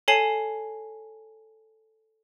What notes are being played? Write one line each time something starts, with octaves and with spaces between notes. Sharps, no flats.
A4 C#5 G#5 A5 C7 F#7